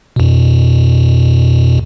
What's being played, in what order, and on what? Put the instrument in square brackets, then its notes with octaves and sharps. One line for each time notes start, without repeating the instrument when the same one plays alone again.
[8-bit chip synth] F2 B2